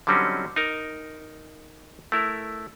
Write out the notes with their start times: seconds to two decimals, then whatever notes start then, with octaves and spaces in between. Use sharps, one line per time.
0.07 D3 F#3 G3 C4 C#4 D#4
0.56 D#4 A#4
2.12 A3 E4 A#4